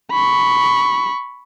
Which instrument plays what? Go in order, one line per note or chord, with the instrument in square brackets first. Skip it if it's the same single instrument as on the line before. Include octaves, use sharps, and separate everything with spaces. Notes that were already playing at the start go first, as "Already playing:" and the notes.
[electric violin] B5 C#6